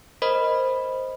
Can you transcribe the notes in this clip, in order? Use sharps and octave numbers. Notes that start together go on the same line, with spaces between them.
A#4 C5 D#5 B5